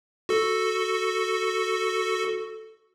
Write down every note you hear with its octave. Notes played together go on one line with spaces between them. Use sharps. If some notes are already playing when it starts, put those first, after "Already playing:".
F#4 A4